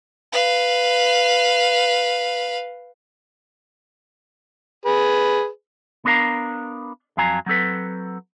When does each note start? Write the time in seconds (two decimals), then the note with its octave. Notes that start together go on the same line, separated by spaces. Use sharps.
0.32 B4 F5
4.86 G#4 B4
6.05 B3 D4 A#4 F5 A#5
7.17 F2 F#3 F5 G#5 A#5
7.46 F#3 C4 A4 B4